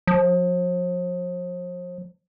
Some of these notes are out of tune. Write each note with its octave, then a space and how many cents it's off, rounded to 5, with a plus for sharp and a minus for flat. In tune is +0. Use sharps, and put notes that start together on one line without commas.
F3 +40